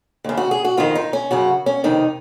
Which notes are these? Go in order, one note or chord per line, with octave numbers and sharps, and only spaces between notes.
D#2 C#3
F#4
G#4
F#4
F2 D#3 F4
D#4
C#4
F#2 C#3 F#4
C#4
F2 C3 D#3 D#4